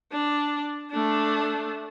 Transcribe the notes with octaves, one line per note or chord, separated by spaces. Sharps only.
D4
A3 D4